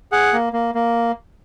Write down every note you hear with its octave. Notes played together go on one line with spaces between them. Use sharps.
G#4 F#5
A#3
A#3
A#3